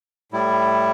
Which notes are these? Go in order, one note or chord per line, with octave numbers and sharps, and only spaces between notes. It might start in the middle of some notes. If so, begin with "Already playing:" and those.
A2 G3 E4